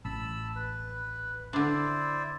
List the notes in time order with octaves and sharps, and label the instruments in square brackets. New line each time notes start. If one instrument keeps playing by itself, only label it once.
[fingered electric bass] A1 [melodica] A5 B5 E6
[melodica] B4
[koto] D3 D4 [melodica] E4 C5 D5